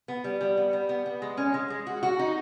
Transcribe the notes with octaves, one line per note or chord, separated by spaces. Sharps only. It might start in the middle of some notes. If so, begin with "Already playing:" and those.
B3
G3
G3
B3
G3
B3
B3
G#3
C#4
G#3
G#3
F#4
F#4
D#4